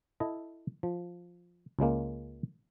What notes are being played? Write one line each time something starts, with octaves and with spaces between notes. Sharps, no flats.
E4 A4 D#5
F3
C#2 C#3 G#3 A#3